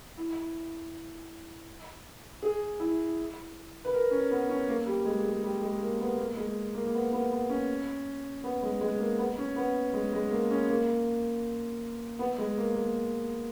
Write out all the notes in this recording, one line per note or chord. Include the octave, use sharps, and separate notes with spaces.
E4
G#4
E4
B4
A#4
C#4
B3
C#4
A#3
G3
G#3
G#3
G3
G#3
A#3
B3
A#3
G#3
A#3
A#3
B3
B3
B3
C#4
B3
G#3
G#3
A#3
B3
C#4
B3
G#3
G#3
A#3
C#4
A#3
B3
G#3
A#3
A#3